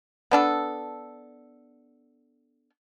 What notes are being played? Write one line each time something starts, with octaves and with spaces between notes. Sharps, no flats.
B3 D4 A4